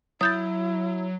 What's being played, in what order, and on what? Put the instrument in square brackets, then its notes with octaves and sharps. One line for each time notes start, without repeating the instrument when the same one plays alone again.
[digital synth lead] F#3 [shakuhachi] E4 [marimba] D#6 G6 A6